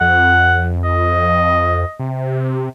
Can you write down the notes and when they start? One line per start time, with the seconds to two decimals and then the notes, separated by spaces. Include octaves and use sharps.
0.01 F2 F#5
0.84 D#5
1.99 C3